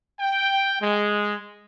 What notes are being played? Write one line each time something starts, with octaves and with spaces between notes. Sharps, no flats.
G5
G#3